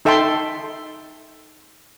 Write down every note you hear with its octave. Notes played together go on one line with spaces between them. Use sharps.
D#4 A4 E5 G5 A5 C6